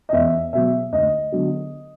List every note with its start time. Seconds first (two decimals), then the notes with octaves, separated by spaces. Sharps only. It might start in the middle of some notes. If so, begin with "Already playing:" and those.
0.09 D#5
0.13 E2 E5
0.53 B2 F#3 B3 E5
0.92 D2 D#5
1.32 D3 F#3 B3